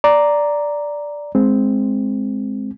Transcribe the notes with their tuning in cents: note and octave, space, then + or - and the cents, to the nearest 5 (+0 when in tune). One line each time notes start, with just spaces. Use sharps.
D5 -5 A#5 +0
G#3 +10 C4 +0